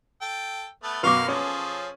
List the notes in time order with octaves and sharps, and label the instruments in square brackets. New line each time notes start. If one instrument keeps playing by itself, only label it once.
[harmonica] A4 G5
A3 B3 A4
[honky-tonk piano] F#2 B2 [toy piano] B4 C#6 D6 [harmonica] F5
[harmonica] F3 G#4 A4 [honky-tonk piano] C#4